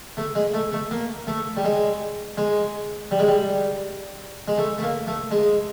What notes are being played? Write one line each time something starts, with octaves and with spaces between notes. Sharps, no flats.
A3
G#3
A3
A3
A#3
A3
G3
G#3
G#3
G3
G#3
G3
G#3
A3
A3
A#3
A3
G#3